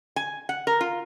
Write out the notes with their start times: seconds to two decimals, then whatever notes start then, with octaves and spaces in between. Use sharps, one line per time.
0.16 G#5
0.49 F#5
0.67 A#4
0.81 F4